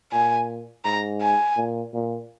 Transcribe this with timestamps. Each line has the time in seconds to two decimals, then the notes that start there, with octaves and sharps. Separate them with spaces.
0.12 A#2 G#5
0.85 G#2 A#5
1.21 G#5
1.57 A#2
1.94 A#2